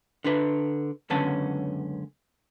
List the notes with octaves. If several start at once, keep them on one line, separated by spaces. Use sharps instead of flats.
D3 D4 B4
C#2 F#2 D3 B3 C#4 A5